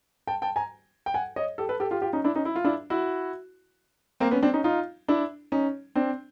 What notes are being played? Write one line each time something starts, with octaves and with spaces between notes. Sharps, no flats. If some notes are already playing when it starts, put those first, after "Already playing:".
G5 A5
G5 A5
G#5 A#5
G5
F#5 G#5
C#5 D#5
G4 A4
A4 B4
G4 A4
F4 G4
F4 G4
C#4 D#4
D4 E4
C#4 D#4
E4
F4
D4 E4
E4 F#4
A#3 C4
B3 C#4
C4 D4
C#4 D#4
D#4 F4
D4 E4
C#4 D#4
C4 D4